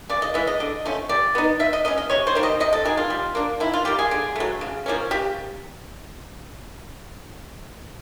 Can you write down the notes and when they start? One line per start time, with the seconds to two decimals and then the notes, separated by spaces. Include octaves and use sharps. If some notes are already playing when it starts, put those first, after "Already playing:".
0.10 C#3 D5
0.22 D#5
0.34 E3 G#3 E5
0.47 D#5
0.60 D3
0.85 F3 A3 C#4
1.09 G3 D5
1.35 B3 D#4
1.59 F3 E5
1.73 D#5
1.85 A3 C#4 D#5
1.98 D#5
2.10 C3 C#5
2.27 C5
2.35 D#3 G3 A#3
2.43 D#5
2.60 C3 D#5
2.73 A4
2.85 D#3 F#3 G#4
2.97 F4
3.10 G3
3.35 A#3 D4
3.60 D#3 E4
3.73 F4
3.85 G3 A#3 G4
3.99 G#4
4.11 D3
4.36 F#3 A3
4.61 C#3
4.86 F3 A#3 C#4
5.11 C#3 G4